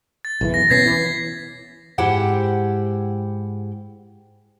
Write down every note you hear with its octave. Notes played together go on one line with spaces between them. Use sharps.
A6
B1 E2 E3
A#6
B2 B3 C#4 G#6 B6 C7
E3
G#2 E4 G4 C5 F#5 G5